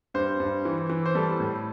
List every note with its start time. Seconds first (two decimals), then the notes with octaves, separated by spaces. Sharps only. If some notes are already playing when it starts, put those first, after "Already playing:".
0.14 G2 C5
0.40 G2
0.65 E3
0.90 E3
1.06 C5
1.15 G3 A4
1.40 A2